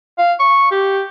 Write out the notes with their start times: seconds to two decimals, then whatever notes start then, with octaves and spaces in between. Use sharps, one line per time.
0.18 F5
0.40 C#6
0.71 G4